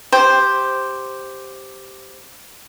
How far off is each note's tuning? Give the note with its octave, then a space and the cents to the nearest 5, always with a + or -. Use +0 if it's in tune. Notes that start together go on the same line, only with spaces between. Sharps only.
G4 +0 C5 +0